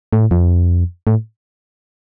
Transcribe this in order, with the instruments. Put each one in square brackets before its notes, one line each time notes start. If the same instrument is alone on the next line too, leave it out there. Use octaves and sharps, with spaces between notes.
[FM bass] A2
F2
A2